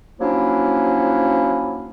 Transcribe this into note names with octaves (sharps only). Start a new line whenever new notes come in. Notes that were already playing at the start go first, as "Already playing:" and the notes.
F3 F#3 A#3 C#4 D4 E4